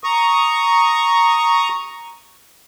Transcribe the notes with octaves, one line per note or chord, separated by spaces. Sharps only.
A#5 C#6 D#6